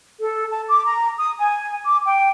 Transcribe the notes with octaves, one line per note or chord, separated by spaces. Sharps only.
A4
A5
D6
A#5
D#6
G#5
D6
G5